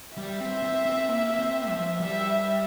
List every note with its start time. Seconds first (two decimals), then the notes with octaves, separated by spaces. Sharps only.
0.17 G3 E5
0.40 C4
0.63 C4
0.85 C4
1.08 A#3
1.39 C4
1.69 F3
2.00 G3 E5